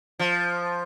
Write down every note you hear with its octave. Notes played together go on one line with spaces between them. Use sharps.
F3